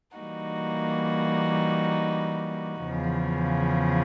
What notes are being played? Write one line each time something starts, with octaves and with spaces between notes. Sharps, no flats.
E3 G3 A#3 D#4 F#4
E2 C#3 F3